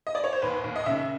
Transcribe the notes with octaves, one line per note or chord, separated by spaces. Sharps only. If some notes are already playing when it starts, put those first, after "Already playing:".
D#5
D5
C#5
C5
D#2 B4
D#2
D#5
C#3 E5